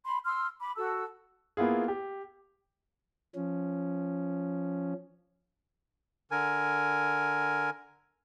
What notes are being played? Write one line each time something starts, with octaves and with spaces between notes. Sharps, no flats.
B5 C6
C6 E6 F6
B5 D6
F#4 A4 A5 E6
A#3 B3 E4 F4 G#4
G4
F3 C#4
D3 A#4 G#5